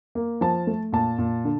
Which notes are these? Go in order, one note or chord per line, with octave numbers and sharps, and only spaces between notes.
A#3
F3 A5
A3
A#2 A5
A#2
D3